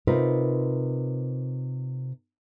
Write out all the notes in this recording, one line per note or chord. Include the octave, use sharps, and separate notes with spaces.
C3 D#4 F4 A#4 B4